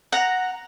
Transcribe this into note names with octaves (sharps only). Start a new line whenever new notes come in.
F#5 A#5